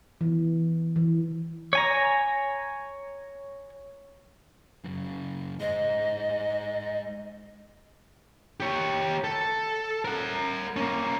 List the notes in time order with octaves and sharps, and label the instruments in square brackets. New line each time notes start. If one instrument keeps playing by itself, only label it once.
[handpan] E3
E3
[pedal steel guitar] C#5 G#5 A#5
[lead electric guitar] F#2 C#3
[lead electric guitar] G#3 C5 [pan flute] D#5
[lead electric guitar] G4 C#5
A4
A#4 F#5
A#3 C#4